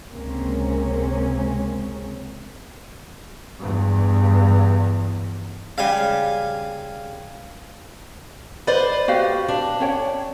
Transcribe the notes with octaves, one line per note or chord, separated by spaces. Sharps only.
C#2 C3 G#3 A#3 C4 C#4
E2 G2
C#3 G3 F5 G#5
B4 C5 D5 D#5
F#4 G4 F5
D4
C#4 C#5 G5